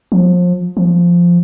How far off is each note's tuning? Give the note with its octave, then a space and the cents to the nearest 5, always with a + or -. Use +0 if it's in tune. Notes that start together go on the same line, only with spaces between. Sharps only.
F3 +30
F3 -5